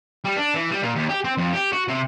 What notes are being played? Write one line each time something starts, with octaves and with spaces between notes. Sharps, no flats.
G3
D4
E3
G3
A#2
D#2
G4
C4
F2
G4
F#4
C3